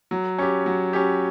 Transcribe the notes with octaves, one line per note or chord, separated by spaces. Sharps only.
F#3
C#4 G4
F#3
C#4 G4